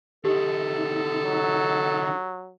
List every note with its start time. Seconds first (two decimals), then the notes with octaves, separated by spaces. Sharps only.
0.25 D3 D#4 G4 A4
1.26 F#3